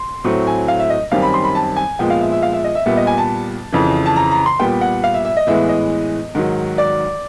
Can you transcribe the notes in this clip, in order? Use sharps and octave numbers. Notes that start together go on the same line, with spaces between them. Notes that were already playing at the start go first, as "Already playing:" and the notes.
Already playing: C6
A2 F#3 A3 C4 C#6
G#5
F5
E5
D#5
F#2 D#3 G3 C4 F5
B5
C6
B5
A5
G#5
A#2 F3 G#3 B3 G5
F5
E5
E5
F5
E5
D#5
E5
A#2 G3 B3 E5
D#5
G#5
A5
F2 C#3 E3
A5
A#5
A#5
C6
A#2 G3 B3 G5
F#5
F5
E5
E5
D#5
A2 E3 G#3 B3 E5
D#5
G#2 D#3 F#3
D5